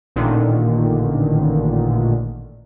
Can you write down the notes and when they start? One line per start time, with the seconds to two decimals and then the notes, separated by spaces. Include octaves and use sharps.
0.16 A1 A#2 D3 D#3